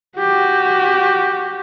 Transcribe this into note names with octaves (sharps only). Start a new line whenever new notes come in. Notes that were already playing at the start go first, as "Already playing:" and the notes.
F#4 G4